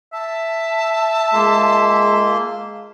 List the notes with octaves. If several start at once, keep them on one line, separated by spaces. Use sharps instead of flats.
E5 A5
G#3 A#3 F4 C6